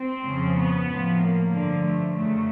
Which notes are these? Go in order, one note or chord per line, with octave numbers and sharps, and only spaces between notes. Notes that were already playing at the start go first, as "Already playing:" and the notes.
Already playing: C4
F2 C#3 F3
B3
A2 F3
A#3
G2 D3 F3
A3
F#2 C#3 F#3 A3